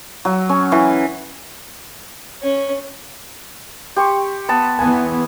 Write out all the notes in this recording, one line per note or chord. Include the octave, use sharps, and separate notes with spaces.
F#3
C#4
E3
C#4
G4 C6 C#6
B3 A5 B5
E2 E3 B3 G#5